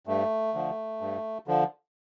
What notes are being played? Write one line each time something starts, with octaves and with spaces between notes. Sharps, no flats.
G2 A3
D3 F3
G2
D3 F3